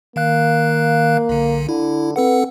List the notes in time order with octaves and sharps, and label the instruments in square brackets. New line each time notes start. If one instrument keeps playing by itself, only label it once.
[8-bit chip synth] D#3 F5 F#6 [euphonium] A#3
[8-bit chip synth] B1 D3
[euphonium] D3 [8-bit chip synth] E4
[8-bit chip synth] C4 A4 F#5 [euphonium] B4